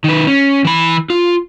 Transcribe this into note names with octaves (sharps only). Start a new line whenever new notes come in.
D#3 B4
C#4
E3 B5
F4